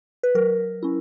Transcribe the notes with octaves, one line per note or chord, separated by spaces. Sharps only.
B4
F#3 A#4
C#4 E4